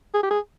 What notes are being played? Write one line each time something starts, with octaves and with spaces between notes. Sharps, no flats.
G#4
G4
G#4